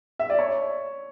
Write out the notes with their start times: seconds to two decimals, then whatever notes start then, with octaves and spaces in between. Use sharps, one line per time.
0.19 E5
0.30 D5
0.39 C#5